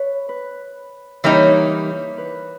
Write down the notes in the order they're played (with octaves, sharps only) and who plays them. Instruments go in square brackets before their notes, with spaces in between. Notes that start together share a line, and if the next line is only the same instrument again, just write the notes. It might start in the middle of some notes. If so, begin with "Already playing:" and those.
Already playing: [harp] B4 C#5
B4
[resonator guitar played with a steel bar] E3 G3 A#3 D#4 [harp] C#5
[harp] B4